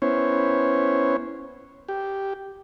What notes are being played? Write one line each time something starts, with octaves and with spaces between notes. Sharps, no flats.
B3 C#4 E4 C5 C#5
G4